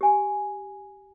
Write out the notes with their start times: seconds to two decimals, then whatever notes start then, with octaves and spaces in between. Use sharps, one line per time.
0.01 G4 G#5